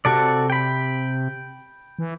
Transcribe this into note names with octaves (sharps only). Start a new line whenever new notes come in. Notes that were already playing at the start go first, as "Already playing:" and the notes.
C3 F#4 A4 D5
G5 B5
E3